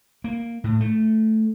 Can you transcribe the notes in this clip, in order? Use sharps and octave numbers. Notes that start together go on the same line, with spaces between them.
A#3
A2
A3